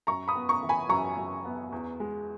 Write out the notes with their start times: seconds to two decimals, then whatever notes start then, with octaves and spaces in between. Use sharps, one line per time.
0.07 F#2 A#5 C#6
0.28 B5 D#6
0.35 B3
0.49 A#5 C#6
0.63 E3
0.69 G#5 B5
0.89 F#2 A#5 C#6
1.18 F#2
1.45 B3
1.72 E2
2.00 G#3